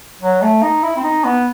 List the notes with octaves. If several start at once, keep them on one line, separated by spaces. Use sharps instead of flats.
F#3
A3
D#4
E4
C4
D#4
B3